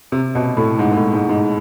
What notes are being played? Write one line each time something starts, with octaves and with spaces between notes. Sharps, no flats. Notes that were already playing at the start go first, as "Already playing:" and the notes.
C3
B2
A2
G#2
G#2
A2
G#2
G#2